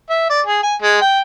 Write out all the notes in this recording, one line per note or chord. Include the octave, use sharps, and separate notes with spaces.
E5
D5
G#4
G#5
G#3
G5